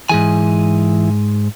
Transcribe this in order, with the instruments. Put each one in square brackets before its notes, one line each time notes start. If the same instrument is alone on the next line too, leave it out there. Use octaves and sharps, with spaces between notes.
[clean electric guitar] G#2 G#4 G#5 [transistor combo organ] E3